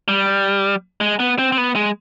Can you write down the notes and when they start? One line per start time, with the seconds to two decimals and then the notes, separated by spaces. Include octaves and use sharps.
0.08 G3
1.01 G#3
1.20 B3
1.38 C4
1.52 C4
1.58 B3
1.76 G#3